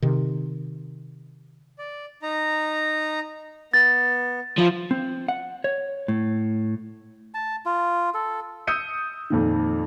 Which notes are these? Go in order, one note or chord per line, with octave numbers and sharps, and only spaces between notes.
C3 D#3
D5
D#4 A#5
B3 A6
F3 E4 C6
C4
F#5
C#5
A2
A5
F4
A4
D#6 E6 G6 C#7 D#7
F2 A#2 D#3